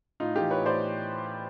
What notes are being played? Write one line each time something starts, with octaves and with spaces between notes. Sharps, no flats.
A2 D#4 F4
E3 F4 G4
B4 C#5
A2
C5 D5